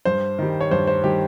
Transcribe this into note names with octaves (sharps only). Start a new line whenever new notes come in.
G2 C5
D#3 G3
C#5
G2 C5
C5
D#3 G3 G4